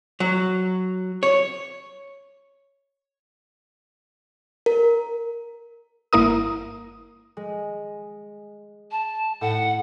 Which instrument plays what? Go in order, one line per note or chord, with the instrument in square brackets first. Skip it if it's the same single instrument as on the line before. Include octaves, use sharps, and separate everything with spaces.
[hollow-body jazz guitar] F#3
C#5
[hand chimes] A#4
[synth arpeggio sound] G1 A#3 E4 A#4 D#6
[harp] G#3
[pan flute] A5
[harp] A2 [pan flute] F#5